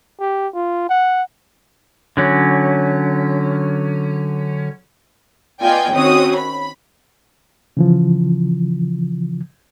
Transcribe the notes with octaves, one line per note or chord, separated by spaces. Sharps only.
G4
F4
F#5
D3 F#3 C#4
B3 F4 D5 D#5 G5 G#5
D#3 C4 C#4 F#4 D#6
B5
C#3 E3 F3